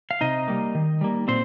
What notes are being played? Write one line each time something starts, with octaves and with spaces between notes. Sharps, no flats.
F5
C3 D#4 D#5
G3 A#3
D#3
G3 A#3
A#2 C4 C5